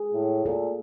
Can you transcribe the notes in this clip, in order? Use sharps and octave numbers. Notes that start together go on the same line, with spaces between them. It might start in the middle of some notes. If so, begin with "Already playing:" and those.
Already playing: G#4
A2
A#2 A4